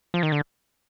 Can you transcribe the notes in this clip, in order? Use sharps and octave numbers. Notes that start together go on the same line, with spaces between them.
F3
D#3
D3